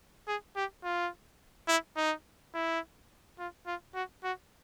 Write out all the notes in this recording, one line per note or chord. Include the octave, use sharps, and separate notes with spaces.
G#4
G4
F4
E4
D#4
E4
F4
F4
F#4
F#4